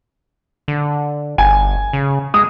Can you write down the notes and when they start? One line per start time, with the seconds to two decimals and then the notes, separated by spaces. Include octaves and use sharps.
0.68 D3
1.38 G1 G#5
1.93 C#3
2.34 G#3 D#6